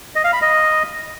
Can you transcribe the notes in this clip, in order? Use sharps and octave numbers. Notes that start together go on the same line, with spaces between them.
D#5
F5
B5
D#5